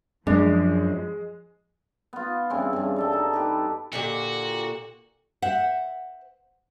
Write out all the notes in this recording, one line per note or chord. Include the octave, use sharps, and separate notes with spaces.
F#2 F3 G#3 D4
B3 F4
G2 C#3 E3 C4
G2 C#3
G3 A4 D#5
D#4 A5
G4 B4
A#2 D3 F#4 G4
C5 E5 F#5